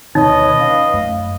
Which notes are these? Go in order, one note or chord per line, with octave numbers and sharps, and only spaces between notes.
D2 B2 D#3 D#4 B4 C#5 D#5
C#4 F5
F#2 A3